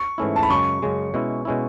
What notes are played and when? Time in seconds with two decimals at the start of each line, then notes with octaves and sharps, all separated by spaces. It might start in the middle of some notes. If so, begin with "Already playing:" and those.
Already playing: C#6
0.18 G#2 E3 A3 C#4 E4
0.36 A5
0.43 B5
0.50 F#2 C#3 G#3 C#6
0.82 F#2 C#3 G#3
1.14 B2 G#3 C#4 E4
1.45 B2 G#3 C#4 E4